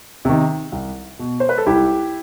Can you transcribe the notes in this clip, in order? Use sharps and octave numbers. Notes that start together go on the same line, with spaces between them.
C3 D#3
C2
B2
C5
B4
A4
C2 E4 G4